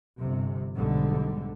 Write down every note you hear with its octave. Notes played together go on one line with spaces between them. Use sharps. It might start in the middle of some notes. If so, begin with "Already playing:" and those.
G1 C3
B1 G#2 D3 G3